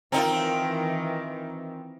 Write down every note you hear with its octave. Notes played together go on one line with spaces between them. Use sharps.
D#3 E3 C4 D#4 F4 A#4 G5 A#5